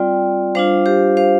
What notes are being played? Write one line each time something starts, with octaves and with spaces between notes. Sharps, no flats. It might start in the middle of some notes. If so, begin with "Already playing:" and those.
Already playing: G3 C4 F4 D5 G5
G3 D4 F4 C5 F5
G4 C5
C5 F5